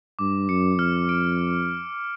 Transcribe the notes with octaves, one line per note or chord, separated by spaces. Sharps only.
G2 D6
F#2 C#7
F2 F6
D7